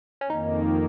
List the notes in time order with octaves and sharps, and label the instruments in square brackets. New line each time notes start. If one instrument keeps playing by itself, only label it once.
[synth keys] C#4
[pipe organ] F2 D#3 A#3 [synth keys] D#4